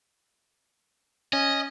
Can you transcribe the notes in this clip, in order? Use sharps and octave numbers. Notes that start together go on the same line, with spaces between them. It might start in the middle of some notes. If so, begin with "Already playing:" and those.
C#4 D#5